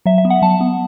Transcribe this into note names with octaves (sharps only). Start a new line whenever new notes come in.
F#3 E5
E5
B3
F#5
F#3 A5
B3